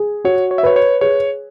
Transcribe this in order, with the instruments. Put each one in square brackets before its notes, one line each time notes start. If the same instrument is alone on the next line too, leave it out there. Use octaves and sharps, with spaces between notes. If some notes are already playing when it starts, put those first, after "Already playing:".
Already playing: [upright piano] G#4
[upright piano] F#4 [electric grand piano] C#5
[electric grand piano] C#5
E5
[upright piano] B4 [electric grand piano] C#5
[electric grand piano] C#5
[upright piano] G#4 [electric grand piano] C#5